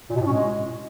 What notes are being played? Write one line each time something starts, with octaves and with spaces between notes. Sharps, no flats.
A#2
B2
A2
C#4
G#3